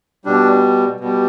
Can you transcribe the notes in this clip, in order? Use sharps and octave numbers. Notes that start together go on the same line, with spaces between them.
B2 G3 D4
B2 G3